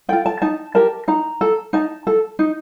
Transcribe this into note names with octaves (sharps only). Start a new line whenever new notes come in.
F4 A4 G5
A5
D#4 A5
G4 A#4 A5
D#4 A#5
A4
D#4 A5
A4
D#4